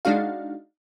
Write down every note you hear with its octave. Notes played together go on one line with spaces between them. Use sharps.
G#3 D4 D#4 F#4 F5